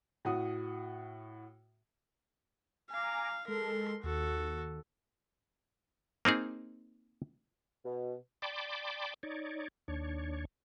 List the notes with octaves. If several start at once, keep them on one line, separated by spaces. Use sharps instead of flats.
A2 F#4 D#6
F5 G#5 A#5 D6
G#3 A4 A#4 C6
D#2 F#4 A4
A#3 C4 D#4 G#4
B2
D5 G5 A5 B5 C6 D6
D#4 C#5 D5
D#2 D4 C#5